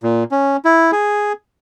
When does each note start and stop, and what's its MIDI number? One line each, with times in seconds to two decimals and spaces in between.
0.03 0.24 46
0.31 0.57 61
0.65 0.91 64
0.92 1.33 68